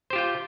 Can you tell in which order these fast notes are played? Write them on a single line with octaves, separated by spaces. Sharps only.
C5 G4 F4 G5